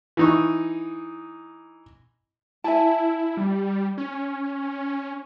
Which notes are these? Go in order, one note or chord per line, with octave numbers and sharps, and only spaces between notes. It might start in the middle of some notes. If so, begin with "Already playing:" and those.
E3 D#4 C#6
E4 E5 G#5 A5
G3
C#4